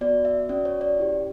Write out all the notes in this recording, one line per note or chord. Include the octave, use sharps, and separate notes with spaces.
B3 F#4 D5
E5
C#4 F#4 D5
C#5
D5
C#4 E4 G4